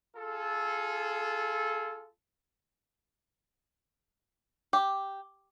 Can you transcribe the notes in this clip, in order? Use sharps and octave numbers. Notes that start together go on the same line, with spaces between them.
F4 G#4 A4
G4